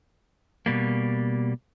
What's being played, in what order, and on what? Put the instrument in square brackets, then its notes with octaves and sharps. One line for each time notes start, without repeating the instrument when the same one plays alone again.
[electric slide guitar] B2 G3 A#3